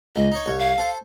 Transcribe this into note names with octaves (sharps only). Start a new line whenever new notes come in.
C#2 D#5
D#4 C#5
C2 C#5
F5
A4 C5